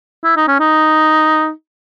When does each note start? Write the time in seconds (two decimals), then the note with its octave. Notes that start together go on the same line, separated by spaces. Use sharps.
0.24 E4
0.36 D#4
0.48 C#4
0.60 D#4